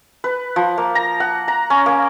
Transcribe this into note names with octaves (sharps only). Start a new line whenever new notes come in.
B4
F3
A#3
A#5
F#5
A#5
C#4
A#3